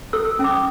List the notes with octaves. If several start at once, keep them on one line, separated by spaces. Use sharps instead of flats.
A4 E6
C#4
D6
D#6